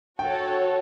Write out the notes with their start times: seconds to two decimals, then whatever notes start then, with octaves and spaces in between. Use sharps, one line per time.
0.19 F#4 A4 C#5 G5